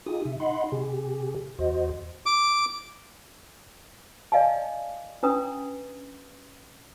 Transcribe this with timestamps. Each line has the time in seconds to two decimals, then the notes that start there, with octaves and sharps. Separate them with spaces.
0.06 D#4 F4 G4 G#4 D#6
0.25 C3 E5
0.40 D#4 D#5 F#5 B5 C6
0.72 C3 G4 G#4
1.59 E2 F#4 C5 D#5
2.26 D6
4.32 D5 D#5 F5 G#5 A5
5.23 C#4 D4 B4 A#5 D#6